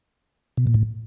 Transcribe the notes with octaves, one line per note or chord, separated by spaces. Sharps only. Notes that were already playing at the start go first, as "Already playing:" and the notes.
B2
A#2
A2